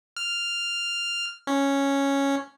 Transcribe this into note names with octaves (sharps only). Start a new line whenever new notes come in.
F6
C#4